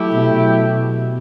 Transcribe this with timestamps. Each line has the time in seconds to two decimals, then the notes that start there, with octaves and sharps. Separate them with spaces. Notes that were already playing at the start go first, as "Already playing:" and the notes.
Already playing: F#3 A3 E4 G4
0.14 B2
0.33 B2